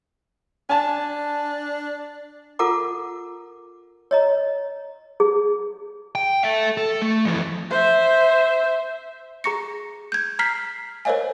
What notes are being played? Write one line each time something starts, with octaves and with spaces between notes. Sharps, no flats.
D4 G#5 A5
F4 A4 A#4 F#5 A#5 D6
C#5 D#5 A#5
G#4
G5
A4 E5
A4
A3
F2 E3
C5 E5
G#4 A#5 C#6 A#6 C#7
G6 G#6
A#5 F6 B6 C7
A#4 C5 C#5 D#5 F5 G#5